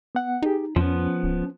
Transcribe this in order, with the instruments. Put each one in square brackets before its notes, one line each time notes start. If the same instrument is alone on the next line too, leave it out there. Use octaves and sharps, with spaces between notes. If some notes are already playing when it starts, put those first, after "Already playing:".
[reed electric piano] B3 F#5
[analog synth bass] D#4 [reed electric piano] G4 G#4
[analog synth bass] F2 [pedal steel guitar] F3 B3 [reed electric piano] C#4
[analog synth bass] D1